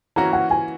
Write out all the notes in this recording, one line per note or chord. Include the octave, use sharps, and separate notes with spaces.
E3 A#3 C#4 F#4 A#5
F#5
G#5